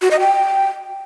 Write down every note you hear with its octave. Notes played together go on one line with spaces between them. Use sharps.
F#4
D#5
G5